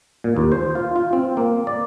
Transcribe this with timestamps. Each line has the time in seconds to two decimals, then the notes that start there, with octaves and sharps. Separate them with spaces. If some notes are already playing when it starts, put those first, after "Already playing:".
0.24 A#2
0.36 D#2
0.52 C5
0.75 F4
0.96 F4
1.13 C4
1.37 A#3
1.67 D5